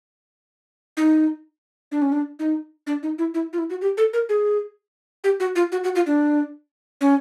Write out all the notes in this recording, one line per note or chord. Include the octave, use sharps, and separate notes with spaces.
D#4
D4
C#4
D4
D#4
D4
D#4
E4
E4
F4
E4
F#4
G4
A4
A#4
G#4
G4
F#4
F4
F#4
F#4
F4
D4
C#4